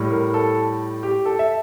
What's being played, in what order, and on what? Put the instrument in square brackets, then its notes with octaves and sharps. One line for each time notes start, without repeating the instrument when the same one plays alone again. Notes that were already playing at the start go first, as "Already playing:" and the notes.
Already playing: [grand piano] A2 G3
A#4
A4
G4
A4
E5